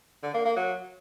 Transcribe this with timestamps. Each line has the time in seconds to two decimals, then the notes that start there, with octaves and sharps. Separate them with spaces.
0.23 D3
0.34 A#3
0.45 A#3
0.56 F#3